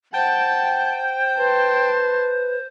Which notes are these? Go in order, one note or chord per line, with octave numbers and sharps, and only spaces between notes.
C5 F#5 G5 A5
B4 A5 C6